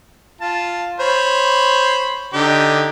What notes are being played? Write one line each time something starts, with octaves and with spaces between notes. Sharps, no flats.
F4 A5
C5 C#5 B5
D3 D#4 G4